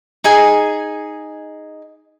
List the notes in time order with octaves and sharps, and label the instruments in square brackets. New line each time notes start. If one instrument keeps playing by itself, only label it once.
[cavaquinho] D#4 G#4 G#5